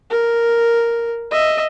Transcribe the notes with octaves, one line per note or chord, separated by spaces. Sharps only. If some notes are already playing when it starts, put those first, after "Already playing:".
A#4
D#5 E5